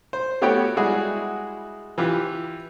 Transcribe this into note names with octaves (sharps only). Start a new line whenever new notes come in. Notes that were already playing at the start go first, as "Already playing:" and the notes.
C5
A3 B3 F#4 G4 C#5 G5
G3 G#3 E4 F#4 G#4
E3 F4 G4